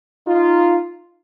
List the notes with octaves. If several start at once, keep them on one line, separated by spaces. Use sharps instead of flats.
D#4 F4